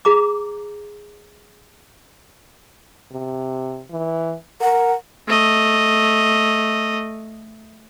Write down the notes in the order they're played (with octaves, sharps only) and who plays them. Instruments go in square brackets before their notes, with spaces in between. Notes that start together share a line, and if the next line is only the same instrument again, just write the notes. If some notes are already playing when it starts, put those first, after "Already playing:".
[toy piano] G#4 A#5 D6
[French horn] C3
E3
[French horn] A#4 [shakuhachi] F#5
[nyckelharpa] A3 D#5